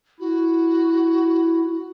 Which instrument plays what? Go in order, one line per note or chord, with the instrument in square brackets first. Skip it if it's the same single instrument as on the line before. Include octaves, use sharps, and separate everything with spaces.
[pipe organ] E4 [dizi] F#4